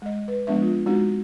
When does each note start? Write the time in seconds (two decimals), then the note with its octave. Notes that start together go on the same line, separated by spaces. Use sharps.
0.02 G#3 D#5
0.28 B4
0.47 F3 G#3 B3 D4 E5
0.62 F4
0.86 G#3 C4 D#4 F#4